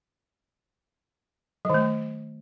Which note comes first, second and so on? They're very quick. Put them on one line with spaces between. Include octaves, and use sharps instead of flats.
F#3 D#3 A3